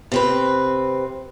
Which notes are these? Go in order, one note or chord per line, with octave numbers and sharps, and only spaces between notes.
C3 C4 B4